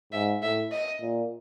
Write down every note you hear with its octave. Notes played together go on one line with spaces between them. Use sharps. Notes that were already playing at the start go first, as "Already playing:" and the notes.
G#2 E5
A2 E5
D#5
A#2